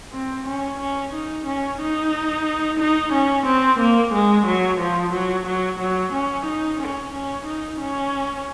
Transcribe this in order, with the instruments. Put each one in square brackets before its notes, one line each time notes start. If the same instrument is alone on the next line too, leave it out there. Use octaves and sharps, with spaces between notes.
[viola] C4
C#4
C#4
D#4
C#4
D#4
D#4
C#4
C4
A#3
G#3
F#3
F3
F#3
F#3
F#3
C#4
D#4
C#4
C#4
D#4
C#4